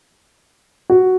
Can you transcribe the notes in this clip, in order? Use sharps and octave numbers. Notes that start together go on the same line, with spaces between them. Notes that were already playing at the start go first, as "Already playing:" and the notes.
F#4